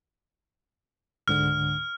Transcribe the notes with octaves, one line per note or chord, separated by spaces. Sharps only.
C#2 G#2 D3 F6